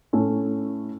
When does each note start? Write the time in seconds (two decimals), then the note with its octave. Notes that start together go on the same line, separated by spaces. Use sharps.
0.13 A2 A3 C#4